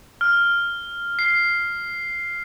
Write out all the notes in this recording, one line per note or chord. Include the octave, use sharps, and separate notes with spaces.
F6
C7